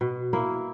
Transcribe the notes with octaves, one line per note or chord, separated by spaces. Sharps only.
B2
A#3 E4